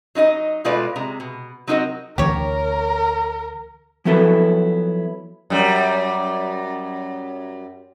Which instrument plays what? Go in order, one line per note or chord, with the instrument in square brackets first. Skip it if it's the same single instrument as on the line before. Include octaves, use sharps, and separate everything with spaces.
[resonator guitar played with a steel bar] F#3 D#4 F4 D#5
B2 G#3 A3 F4 B4 D5
C3 G#3 A#5
B2
F#3 C4 D#4 F#4 A#4 D#5
[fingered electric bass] D2 E3 D4 [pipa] G4 C#5 [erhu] A#4
[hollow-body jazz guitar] F3 F#3 B3 E4 A4 B4
[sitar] F#2 G3